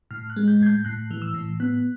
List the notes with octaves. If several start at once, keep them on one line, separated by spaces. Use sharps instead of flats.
A2 F6
F#6
G#3
G6
A2 G#6
G6
A2 F#6
E3
E6
A2
B3 F#6